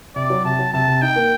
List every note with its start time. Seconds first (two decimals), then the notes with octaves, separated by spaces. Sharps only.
0.16 C3 D5
0.30 F#3
0.45 C3 A5
0.59 F#3
0.73 C3 A5
0.88 C3
1.02 D#4 G5
1.16 A#3